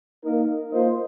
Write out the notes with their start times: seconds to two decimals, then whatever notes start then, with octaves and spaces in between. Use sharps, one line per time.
0.24 A#3 D#4 A#4 D#5
0.71 A#3 F4 C5 D#5